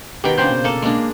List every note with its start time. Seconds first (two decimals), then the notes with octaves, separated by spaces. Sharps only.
0.24 B2 D#3 G4 G5
0.38 A#2 C#3 D4 C5 G5 C6 G6
0.51 B2
0.64 A#3 A4
0.82 G#3 A#3 D4